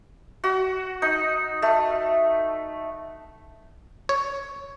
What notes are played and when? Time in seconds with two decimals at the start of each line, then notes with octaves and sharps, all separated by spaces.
0.44 F#4
1.02 D#4
1.62 A3
4.09 C#5